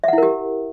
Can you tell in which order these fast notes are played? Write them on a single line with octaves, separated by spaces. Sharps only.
E5 F#5 E4 A#4 G4